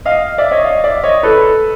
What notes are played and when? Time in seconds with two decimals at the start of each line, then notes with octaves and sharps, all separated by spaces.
0.05 D#5 F5
0.38 D5 E5
0.51 C#5 D#5
0.64 D#5 F5
0.84 D5 E5
1.04 C#5 D#5
1.23 A4 B4